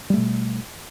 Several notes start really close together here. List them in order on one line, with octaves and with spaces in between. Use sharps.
G3 A3 B2